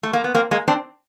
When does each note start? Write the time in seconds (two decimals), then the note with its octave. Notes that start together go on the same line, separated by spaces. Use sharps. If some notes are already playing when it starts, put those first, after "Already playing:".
0.03 A3
0.13 A#3
0.24 B3
0.35 A#3 C4
0.51 G#3 A#3
0.68 C4 D4